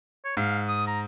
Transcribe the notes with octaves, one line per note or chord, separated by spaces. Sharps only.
C#5
G#2 F5
D#6
A#5